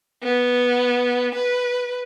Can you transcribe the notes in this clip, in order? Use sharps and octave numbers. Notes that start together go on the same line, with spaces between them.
B3
B4